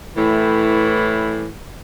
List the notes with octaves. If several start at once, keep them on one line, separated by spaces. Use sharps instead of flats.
A2 E3